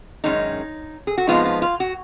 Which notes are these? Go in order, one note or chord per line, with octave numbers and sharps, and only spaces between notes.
F#2 D#3 G#3 C#4 D#4
G#4
F#4
F2 F3 G#3 B3 D#4 F4
F4
F4
F#4